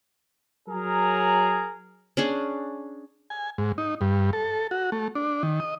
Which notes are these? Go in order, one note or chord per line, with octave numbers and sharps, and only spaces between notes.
F#3 G#4 A#4 A#5
C#4 D4 G#4
G#5
G#2
D#4
G2
A4
F#4
A3
D4
D#3
D#5